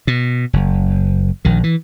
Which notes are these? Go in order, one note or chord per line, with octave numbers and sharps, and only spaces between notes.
B2
F#1
A#1 D#3
E3